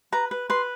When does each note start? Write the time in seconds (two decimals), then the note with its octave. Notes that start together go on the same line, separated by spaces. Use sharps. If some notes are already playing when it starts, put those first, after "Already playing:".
0.12 B4 A#5
0.31 B4
0.50 B4 C6